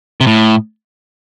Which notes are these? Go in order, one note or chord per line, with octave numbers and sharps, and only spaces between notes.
C3
A2